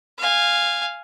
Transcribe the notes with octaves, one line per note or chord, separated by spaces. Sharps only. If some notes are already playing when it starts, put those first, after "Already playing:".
F5 G#5